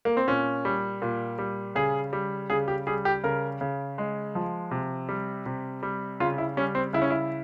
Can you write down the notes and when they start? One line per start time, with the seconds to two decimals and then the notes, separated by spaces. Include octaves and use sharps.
0.05 A#3
0.17 C4
0.28 A#2 C#4
0.65 G3
1.02 A#2
1.38 G3
1.75 C#3 G#4
2.13 G3
2.50 C#3 G#4
2.68 G4
2.87 G3 G#4
3.05 G4
3.24 C#3 A#4
3.61 C#3
3.98 G#3
4.35 F3
4.71 C3
5.09 G3
5.46 C3
5.83 G3
6.20 C#3 F4
6.38 E4
6.57 G3 C#4
6.75 C4
6.93 C#3 E4
7.02 C#4
7.10 E4